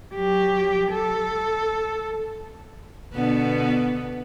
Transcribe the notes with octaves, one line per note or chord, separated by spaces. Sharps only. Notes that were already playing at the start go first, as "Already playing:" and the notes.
F#3 G4
A4
B2 D3 B3